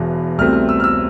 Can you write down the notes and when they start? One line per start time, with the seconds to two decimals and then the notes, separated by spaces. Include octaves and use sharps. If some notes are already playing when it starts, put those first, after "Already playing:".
Already playing: E1 E2 B2
0.38 C2 B2 A3 C4 F6
0.53 F6
0.69 E6
0.80 F6
0.84 E6